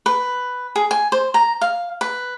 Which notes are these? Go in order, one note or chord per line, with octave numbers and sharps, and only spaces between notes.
B4
G#4
G#5
C5
A#5
F5
B4